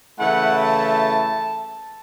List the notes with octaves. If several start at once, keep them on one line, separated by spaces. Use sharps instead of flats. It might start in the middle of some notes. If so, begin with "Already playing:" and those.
C#3 E3 A3 E4 F#5
A5